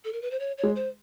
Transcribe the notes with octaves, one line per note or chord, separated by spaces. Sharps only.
A4
A#4
B4
C5
C#5
C#5
G#3
C5